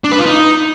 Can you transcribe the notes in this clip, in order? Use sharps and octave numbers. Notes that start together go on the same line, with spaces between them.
D4
B4
F4
D#4